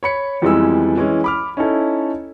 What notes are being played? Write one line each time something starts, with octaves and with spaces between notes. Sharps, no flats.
C#5 B5 C#7
F2 E3 G3 G#3 B3 E6
E3 G#3 C#4
B5 D6 F6
C#4 D#4 E4 A4